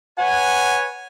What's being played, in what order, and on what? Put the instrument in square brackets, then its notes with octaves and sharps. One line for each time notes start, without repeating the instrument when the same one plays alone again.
[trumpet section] B4 C#5 G#5 [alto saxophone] F#5